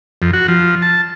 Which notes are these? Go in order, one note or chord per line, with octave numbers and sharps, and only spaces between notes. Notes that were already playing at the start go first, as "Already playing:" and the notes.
F2
F#4
F3
A5